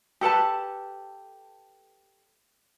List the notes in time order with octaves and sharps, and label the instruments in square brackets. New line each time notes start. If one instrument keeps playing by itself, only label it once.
[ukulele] G4 A4 B4 A5